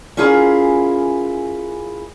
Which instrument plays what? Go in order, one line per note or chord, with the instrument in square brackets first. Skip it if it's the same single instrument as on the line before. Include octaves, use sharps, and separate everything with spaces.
[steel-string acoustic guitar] C#4 E4 F4 G#4 A#4